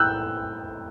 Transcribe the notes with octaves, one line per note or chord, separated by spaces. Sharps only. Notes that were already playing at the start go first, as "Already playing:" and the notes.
Already playing: A2 E6 F#6 G6